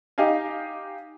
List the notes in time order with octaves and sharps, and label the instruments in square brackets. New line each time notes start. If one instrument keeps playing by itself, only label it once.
[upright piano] D#4 G4 D#5 F5 G#5